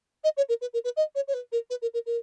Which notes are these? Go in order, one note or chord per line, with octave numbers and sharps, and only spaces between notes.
D#5
C#5
A#4
B4
A#4
B4
D#5
C#5
C#5
B4
A#4
B4
A#4
A#4
A#4